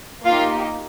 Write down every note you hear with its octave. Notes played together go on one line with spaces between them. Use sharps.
A#3 D#4 F4 G4 F5